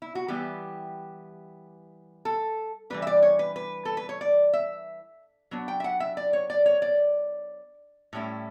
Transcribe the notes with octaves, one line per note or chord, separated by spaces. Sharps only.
E4
F#4
E3 G3 B3 E4 G4
A4
E3 G3 D4 B4
E5
D5
C#5
B4
B4
A4
B4
C#5
D5
E5
F#3 B3 D4
G5
E5
F#5
E5
D5
C#5
D5
C#5
D5
A2 G3 C#4 E4